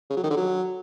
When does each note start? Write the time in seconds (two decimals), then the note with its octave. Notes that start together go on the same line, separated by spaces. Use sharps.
0.10 C#3
0.17 F#3
0.24 D#3
0.30 D3
0.37 F#3